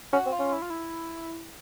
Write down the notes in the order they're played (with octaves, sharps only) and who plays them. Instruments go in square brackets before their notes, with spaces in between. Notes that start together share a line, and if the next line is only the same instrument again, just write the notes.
[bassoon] C#4 [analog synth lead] F#4
[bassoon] C4
[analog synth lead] F4
[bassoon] C#4
[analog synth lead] E4
F4
E4